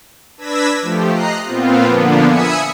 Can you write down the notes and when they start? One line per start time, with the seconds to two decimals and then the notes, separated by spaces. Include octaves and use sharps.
0.38 D4 B4 E6 G#6 A#6 B6
0.82 F3 A3 G4
1.11 D#5 A#5 F#6 C7
1.44 A#2 B3 C4 F4
1.86 D3 F3 A#3 B3 D4
2.28 E5 G#5 B5 D#6 E6 C#7